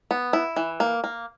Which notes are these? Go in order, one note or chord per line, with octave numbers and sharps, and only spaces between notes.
B3
E4
E3
A#3
A#3